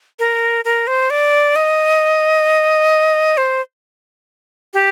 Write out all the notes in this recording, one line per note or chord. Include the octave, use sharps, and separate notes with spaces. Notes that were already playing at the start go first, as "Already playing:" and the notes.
A#4
A#4
C5
D5
D#5
C5
G4